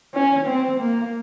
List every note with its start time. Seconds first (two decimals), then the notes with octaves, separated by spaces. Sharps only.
0.14 C#4
0.46 C4
0.80 A#3